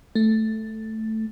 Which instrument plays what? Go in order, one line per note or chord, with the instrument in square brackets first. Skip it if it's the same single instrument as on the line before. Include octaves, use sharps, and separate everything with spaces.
[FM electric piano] A3